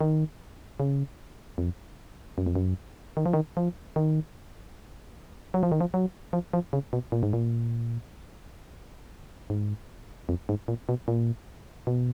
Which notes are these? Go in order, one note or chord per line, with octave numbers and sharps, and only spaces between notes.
D#3
C#3
F2
F#2
F2
F#2
D#3
F3
D#3
F3
D#3
F#3
F3
D#3
F3
F#3
F3
F3
C#3
B2
A#2
G#2
A#2
G#2
F2
G#2
A#2
B2
A#2
B2